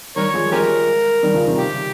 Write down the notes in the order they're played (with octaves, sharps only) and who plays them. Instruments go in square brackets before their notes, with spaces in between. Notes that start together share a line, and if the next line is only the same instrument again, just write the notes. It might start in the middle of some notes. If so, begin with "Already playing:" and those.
[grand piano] D#3 G3 [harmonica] A#4 C#5
[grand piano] F3 G#3
[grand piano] F3 G#3 [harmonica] C#4 G4 A#4
[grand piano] D#3 G3
C#3 F3
C3 D#3
[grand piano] C#3 [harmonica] G4